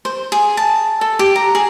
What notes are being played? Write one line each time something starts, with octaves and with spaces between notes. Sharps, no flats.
C5
G#4
A5
A4
G4
A#5
G#4